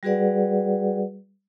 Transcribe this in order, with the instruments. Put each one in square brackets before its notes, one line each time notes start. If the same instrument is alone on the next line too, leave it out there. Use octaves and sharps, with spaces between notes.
[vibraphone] G3 F#4 G#4 B4 D5 F#5